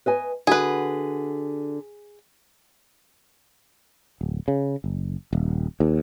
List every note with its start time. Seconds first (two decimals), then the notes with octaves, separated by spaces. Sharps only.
0.06 B4 D#5 G#5
0.47 D3 F#4 G#4 B4
4.21 D1
4.48 C#3
4.84 F#1
5.33 D#1
5.80 D#2